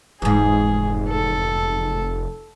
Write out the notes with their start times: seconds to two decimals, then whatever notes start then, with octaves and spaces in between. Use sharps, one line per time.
0.22 F1 E2 G#2 G#4
1.09 A4